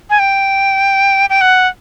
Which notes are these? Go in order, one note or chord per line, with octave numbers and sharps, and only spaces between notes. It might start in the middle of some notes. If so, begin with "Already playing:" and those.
G#5
G5
G5
F#5